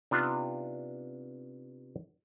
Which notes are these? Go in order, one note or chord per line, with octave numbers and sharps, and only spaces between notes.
C3 B3 D4 D#4 F4